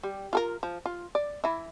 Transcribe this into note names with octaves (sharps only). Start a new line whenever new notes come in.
G3
F4 A4 A#4
F3
F4
D5
E3 E4